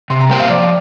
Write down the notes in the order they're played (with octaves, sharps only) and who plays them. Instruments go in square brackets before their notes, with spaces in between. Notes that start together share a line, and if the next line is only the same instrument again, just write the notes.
[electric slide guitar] C3 [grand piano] C6
[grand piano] A#5
[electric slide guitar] G3 A#3 G4 C5 [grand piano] G5
[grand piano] F5
[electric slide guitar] F3 [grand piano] D5